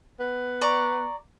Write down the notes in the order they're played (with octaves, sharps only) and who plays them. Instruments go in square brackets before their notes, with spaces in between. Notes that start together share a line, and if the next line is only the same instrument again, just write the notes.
[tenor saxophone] B3
[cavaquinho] D5 A#5 C#6